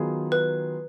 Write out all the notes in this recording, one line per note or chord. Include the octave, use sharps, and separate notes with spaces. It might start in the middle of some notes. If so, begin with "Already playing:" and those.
Already playing: D#3 F#3 B3 F4 G#4
B4